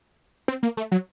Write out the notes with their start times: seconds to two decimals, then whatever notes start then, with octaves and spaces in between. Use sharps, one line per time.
0.48 C4
0.63 A#3
0.77 A3
0.92 F#3